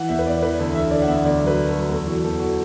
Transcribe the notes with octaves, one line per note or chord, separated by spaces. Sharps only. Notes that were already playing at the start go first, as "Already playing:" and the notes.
Already playing: E3 F#5
E2 E5
B4
E2 D5
E3 B4
D2 A4
D2 E5
D3 D5
F#5
B3 E5
D2 D5
F#3
B4
A3
A4
F#3
E2 A4
E3 F#4
E2 A4
F#4